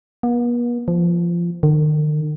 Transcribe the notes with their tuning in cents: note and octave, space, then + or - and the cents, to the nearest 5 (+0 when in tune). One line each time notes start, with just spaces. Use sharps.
B3 -45
F3 -20
D#3 -45